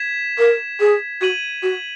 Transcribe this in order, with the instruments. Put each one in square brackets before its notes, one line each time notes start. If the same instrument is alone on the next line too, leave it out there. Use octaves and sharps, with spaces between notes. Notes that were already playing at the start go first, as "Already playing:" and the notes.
Already playing: [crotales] G#6 B6 E7
[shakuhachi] A#4
G#4
[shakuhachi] F#4 [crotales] G#6 D#7 F#7
[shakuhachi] F#4